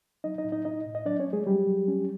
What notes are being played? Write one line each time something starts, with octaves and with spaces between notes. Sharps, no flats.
F#3 D#4 D#5
D#4 D#5
A2
D#4 D#5
A2 D#4 D#5
A2
D#5
F#3 D4 D5
C#4 C#5
A3
G#3 G#4
F#3 G3 G4
F#3
C#4